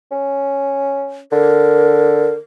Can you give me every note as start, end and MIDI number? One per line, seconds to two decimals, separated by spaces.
0.11 1.21 61
1.32 2.33 50
1.32 2.34 70